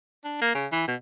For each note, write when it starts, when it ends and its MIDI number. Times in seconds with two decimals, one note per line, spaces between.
0.24 0.40 62
0.41 0.52 58
0.55 0.67 49
0.72 0.87 52
0.88 0.95 47